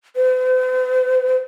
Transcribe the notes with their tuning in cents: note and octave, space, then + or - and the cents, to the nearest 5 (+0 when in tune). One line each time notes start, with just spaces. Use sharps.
C5 -45